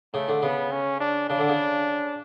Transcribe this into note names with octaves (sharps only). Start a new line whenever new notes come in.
C#3 A3
D3
C#3 B3
C#4
D4
C#3 D4
D3
C#3